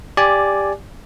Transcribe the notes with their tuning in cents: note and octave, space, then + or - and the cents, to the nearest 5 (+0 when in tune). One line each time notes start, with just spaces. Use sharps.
G4 +15 D5 +0 G#5 +15